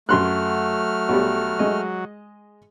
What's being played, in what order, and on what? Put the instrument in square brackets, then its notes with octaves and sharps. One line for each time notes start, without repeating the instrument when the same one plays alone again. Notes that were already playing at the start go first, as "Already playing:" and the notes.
[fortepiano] F#2 C6 F#6 [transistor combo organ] F#3 [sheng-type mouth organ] A3 F6
[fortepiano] B1 G3
G#3 D#5